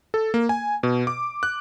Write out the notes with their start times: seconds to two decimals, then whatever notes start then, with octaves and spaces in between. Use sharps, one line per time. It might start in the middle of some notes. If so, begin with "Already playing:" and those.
0.14 A4
0.34 A#3
0.49 G#5
0.83 B2
1.07 D6
1.43 F#6